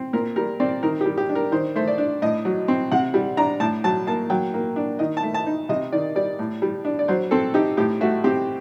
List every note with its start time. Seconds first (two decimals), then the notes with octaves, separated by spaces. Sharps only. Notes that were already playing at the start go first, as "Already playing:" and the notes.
Already playing: C4
0.13 A#2 A#4
0.36 G3 A#4
0.60 C4 D5
0.83 D#3 A#4
1.01 G4
1.06 G3
1.18 G4
1.29 D4
1.35 A#4
1.52 D#3 C5
1.76 A3 C5
1.88 D5
1.98 D4
2.22 A2 D#5
2.45 F#3
2.68 C4
2.92 C3 F#5
3.14 G3
3.37 D4 A#5
3.60 A2 A5
3.84 F#3 A5
4.07 A#3 A5
4.30 F#3 G5
4.54 A#3
4.76 D4
4.99 D#3 D#5
5.17 A5
5.23 A3
5.34 A5
5.46 D#4
5.69 C3 D#5
5.92 D#3 D5
6.16 G3 D5
6.39 A2
6.62 G3
6.85 D4
6.99 D5
7.08 F#3 C5
7.31 C4 A4
7.54 D#4 G4
7.77 A2 G4
8.01 A3 F#4
8.24 C4 G4